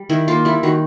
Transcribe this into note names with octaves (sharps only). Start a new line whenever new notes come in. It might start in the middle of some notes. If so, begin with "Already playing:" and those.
Already playing: G3
D#3 E4
A#3 F4
G3 E4
D#3 F#4